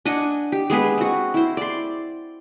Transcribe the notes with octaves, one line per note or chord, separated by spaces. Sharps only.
D4 D#5 F#5 G#5
G4
G#3 B3 G#4 B4
C4 F#4
E4 C5
D5 C6